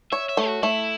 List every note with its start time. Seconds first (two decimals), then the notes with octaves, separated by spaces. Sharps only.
0.12 C#5 E5
0.29 E5
0.37 A3
0.46 F#4
0.62 A3 E4